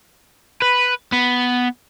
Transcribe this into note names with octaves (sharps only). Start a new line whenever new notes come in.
B4
B3